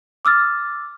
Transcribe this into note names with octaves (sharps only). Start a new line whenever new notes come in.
D6 E6 F6 A6